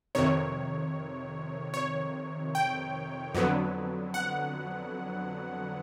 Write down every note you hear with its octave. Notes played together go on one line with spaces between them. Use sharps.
F2 C3 D#3 C#5
C#5
G5
F2 D3 F#3 B3
F#5